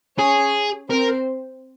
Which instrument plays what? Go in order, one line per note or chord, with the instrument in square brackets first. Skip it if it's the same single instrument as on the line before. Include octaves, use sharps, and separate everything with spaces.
[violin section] C#4 C#5 [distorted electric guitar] G#4
[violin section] C4 C5 [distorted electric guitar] A#4